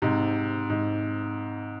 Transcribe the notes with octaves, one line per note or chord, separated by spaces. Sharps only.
G#2 C3
G#2